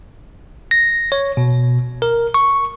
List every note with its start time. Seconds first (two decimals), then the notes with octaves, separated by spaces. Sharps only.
0.71 A#6
1.12 C#5
1.37 B2
2.02 A#4
2.34 C#6